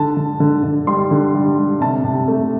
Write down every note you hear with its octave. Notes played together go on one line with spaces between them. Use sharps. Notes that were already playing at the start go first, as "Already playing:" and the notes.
Already playing: D3 A5
D3
D3
D3
G3 C6
D3
G3
G3
C3 A5
C3
A3